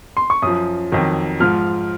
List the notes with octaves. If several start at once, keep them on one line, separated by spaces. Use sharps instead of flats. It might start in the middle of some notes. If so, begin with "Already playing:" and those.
C6
C#6
F#2 F3 D#6
F2 D#3 F#3
G#2 F3 F6